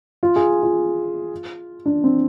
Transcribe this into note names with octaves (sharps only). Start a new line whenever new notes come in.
F4
G#4
F4
D4
C4